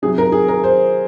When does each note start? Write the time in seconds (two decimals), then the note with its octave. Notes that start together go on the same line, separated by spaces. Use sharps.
0.02 C3 F#3 G#4
0.18 A#4
0.32 G#4
0.48 A#4
0.64 C5